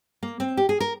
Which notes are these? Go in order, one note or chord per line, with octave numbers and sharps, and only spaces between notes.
A#3
C4
G4
G#4
A#4